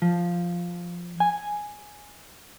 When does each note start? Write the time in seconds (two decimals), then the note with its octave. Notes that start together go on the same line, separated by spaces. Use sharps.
0.02 F3
1.20 G#5